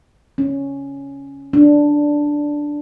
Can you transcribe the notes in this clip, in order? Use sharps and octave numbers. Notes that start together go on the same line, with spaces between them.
C#4
D4